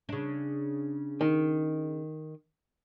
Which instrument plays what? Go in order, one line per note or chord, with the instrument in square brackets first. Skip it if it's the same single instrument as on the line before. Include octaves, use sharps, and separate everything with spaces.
[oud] C#3 D4
[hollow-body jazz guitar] D#3